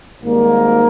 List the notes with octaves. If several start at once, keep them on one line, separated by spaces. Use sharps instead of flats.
G#1 G#2 G3 A#3